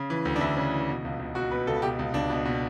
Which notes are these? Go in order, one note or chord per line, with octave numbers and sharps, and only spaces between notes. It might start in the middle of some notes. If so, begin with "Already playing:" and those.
Already playing: C#3
E3
D2
D4
D2 E4
C#3
E3
B2
C#2
C#2
B2 F#4
B2 B4
C#2 A4
B2 G4
C#2
C#2 D4
B2
B2